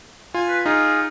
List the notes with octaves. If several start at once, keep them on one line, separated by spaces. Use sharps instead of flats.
F4 G#5
B4
D#4 F4 G#4 F5